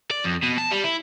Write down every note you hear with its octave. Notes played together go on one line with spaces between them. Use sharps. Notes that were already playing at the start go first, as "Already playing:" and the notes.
D5
F2
B2
A5
G3
E4